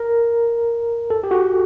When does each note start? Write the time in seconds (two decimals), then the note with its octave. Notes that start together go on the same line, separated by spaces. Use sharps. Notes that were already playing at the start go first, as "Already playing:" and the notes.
Already playing: A#4
1.10 A4
1.23 G4
1.31 F#4